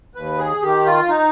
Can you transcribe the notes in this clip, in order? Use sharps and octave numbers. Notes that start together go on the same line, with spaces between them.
D#2 B4
G#4
D#3 G4
F4
D#4